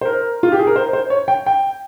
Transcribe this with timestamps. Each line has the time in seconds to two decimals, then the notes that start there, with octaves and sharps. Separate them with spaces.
0.01 C5
0.05 A#4
0.43 F4
0.52 G4
0.59 G#4
0.67 A#4
0.76 C5
0.93 C5
1.10 C#5
1.28 G5
1.46 G5